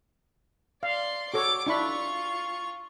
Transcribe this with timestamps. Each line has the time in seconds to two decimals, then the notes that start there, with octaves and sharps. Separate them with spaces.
0.83 D5 F5 C6
1.34 F#4 A4 C#5 D6
1.66 D4 E4 F4 B5 C#6